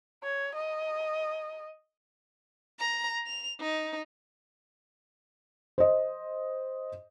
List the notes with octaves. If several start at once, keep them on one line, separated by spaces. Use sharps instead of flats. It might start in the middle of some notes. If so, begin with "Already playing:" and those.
C#5
D#5
A#5
F7
D#4
C5 D#5